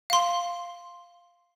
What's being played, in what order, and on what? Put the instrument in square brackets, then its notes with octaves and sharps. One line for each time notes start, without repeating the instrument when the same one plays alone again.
[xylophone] F5 C6